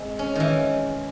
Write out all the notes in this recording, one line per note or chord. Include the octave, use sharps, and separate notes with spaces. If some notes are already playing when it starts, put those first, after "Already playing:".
Already playing: G#3 C4
C#4
D#3 E3